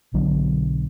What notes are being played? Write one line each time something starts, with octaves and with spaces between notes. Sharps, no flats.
B1 B2 D3 F#3